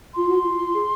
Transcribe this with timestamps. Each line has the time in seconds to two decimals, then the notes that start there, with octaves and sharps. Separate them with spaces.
0.14 F4 C6
0.29 F#4
0.44 F4
0.59 F4
0.74 G#4